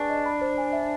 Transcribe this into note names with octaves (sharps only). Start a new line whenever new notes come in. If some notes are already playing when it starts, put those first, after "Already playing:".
Already playing: D4 G#4 B4 G#5 C#6
D#5
B5
C5
G#5
E5